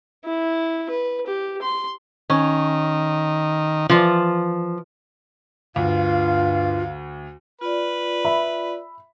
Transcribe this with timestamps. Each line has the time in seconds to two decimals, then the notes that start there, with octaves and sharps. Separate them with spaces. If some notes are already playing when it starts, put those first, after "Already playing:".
0.25 E4
0.90 B4
1.27 G4
1.62 C6
2.30 D#3 C#4
3.90 E3 F3 F4 D5
5.76 D2 G2 F4 F5
7.61 F4 B4 D5
8.25 E5 B5